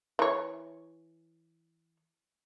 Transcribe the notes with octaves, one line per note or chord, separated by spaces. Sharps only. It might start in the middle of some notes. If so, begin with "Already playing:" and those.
E3 C#5